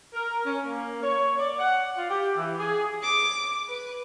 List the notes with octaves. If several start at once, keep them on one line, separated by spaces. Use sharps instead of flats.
A#4
C#4
A#3
C#5
D5
F#5
F4
G4
E3
G#4
D6
B4